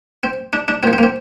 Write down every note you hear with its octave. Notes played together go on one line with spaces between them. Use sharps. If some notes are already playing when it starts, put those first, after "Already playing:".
C4
D4
D4
A#2 F3 C4
C4
A#3
C4